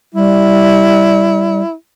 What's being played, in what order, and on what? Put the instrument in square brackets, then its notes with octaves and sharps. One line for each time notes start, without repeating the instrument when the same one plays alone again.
[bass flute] G3 [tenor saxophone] E4